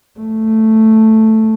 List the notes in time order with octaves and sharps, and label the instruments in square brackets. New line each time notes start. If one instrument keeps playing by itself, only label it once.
[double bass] A3